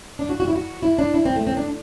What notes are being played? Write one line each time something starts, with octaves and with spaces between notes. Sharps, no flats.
D4
F#4
F#4
E4
F#4
E4
D4
E4
C4
A3
C4
D4